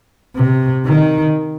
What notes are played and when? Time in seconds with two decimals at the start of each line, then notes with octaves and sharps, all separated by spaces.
0.35 C3
0.86 D#3